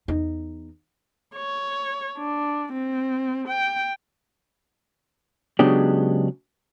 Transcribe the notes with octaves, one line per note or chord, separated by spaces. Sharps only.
E2 D#4
C#5
D4
C4
G5
C#3 F#3 G#3 B3 D4 G4